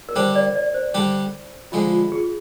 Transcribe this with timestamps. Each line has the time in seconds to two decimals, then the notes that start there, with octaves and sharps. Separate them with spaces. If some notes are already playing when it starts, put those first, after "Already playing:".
0.09 A#4
0.16 D3 G3 D4 G4 C5
0.36 D5
0.56 D5
0.74 C5
0.94 D3 G3 D4 G4
1.72 D3 F3 G#3 F4
1.93 F4
2.12 G#4